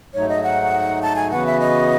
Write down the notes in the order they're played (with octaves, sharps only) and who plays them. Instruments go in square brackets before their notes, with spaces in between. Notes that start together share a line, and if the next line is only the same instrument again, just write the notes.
[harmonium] G#2 F#3 A3 D#4 [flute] C#5
[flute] D#5
F#5
A5
G#5
[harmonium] C#3 E3 B3 F#4 B4 [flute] F#5
[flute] E5
D#5